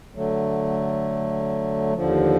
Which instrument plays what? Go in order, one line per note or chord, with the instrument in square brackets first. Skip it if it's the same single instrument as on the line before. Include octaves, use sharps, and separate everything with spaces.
[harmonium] D3 F#3 A3
D#2 D3 F3